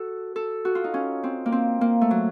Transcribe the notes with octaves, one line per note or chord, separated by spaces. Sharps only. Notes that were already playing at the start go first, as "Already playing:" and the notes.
Already playing: F#4 A4
A4
F#4
F4
D#4
C#4
C4
A#3
C4
A#3
A3
F#3